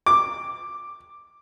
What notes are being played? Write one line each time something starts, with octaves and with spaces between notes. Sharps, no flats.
D6